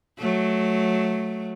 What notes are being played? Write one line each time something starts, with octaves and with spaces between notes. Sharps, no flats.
F#3 A3